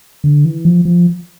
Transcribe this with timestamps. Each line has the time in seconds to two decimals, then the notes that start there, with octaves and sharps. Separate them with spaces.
0.24 D3
0.45 E3
0.65 F3
0.85 F3